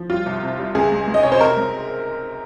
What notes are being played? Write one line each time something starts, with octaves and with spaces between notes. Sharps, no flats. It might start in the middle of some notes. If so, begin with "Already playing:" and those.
Already playing: F3
G3 F4
C2
C3
G3
C#2 G#4
G#3
G#3
D#5
C3 C#5
C5
C3 A#4
G#3